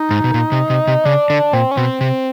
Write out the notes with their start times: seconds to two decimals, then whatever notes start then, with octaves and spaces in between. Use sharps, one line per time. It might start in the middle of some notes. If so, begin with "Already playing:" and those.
Already playing: D#4
0.11 G#2
0.24 B2
0.34 A#2
0.52 C3
0.70 C3
0.87 C3
1.05 C#3 D4
1.30 D3 D4
1.53 A#2 C4
1.71 C#4
1.77 B2 C4
2.01 C3 C4